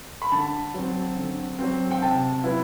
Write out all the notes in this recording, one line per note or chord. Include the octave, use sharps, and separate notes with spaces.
B5
D3 A5
F#3 C4
D3
F#3 C4
G5
C3 A5
F#3 B3 E4